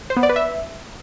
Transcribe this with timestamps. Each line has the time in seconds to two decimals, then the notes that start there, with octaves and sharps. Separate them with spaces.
0.10 C5
0.17 B3
0.23 D5
0.29 B4
0.36 E5